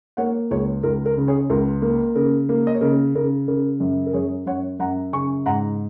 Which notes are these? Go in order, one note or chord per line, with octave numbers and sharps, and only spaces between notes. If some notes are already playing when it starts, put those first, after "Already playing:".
A#3 C#5 F#5
C#2 G#4 C#5
C#2 A#4
A#4
C#3
G#4 C#5
C#2 A#4
A#3
C#3 A#4
A#3
D#5
C#5
C#3 A#4
C#3 A#4
C#3 A#4
F#2
A#4
F#2 G#4 C#5
F#2 C#5 F#5
F#2 F#5 A#5
C#3 G#5 C#6
G#2 F#5 A#5